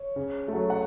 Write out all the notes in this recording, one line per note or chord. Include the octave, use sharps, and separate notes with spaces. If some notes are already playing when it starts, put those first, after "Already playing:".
Already playing: C#5
C#3
F#3 A3
F#5